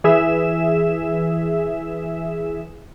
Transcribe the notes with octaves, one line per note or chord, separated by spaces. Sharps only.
E3 G#4 E5 E7